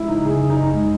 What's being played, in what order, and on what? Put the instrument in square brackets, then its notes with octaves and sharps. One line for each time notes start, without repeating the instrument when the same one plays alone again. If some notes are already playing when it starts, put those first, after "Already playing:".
Already playing: [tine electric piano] G#3 [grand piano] E4
[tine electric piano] C#3 [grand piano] D#4
[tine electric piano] C#3 [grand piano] G#4
[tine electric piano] F#2
[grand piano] D#4
[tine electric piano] G#1
G#3